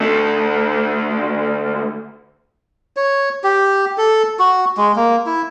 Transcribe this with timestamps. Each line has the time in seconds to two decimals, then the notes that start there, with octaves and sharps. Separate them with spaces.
0.01 D2 A3
2.97 C#5
3.44 G4
3.98 A4
4.39 F#4
4.77 G#3
4.96 A#3
5.26 E4